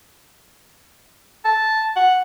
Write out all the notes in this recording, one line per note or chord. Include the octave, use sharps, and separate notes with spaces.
A5
F#5